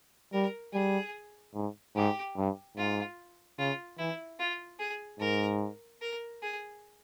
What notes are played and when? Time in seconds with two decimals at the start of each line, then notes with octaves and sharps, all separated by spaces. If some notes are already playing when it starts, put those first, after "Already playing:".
0.33 G3 A#4
0.73 G3 G#4
1.55 G#2
1.96 G#2 G4
2.37 G2
2.77 G#2 F4
3.58 C#3 F4
3.98 E3 E4
4.39 F4
4.79 G#4
5.20 G#2 A#4
6.01 A#4
6.42 G#4